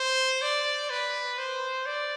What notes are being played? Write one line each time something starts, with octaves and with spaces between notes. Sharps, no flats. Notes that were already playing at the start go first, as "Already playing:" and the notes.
Already playing: C5
D5
B4
C5
D5